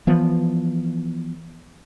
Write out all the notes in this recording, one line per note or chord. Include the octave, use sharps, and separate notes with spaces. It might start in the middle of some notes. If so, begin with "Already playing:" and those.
E3 F3 B3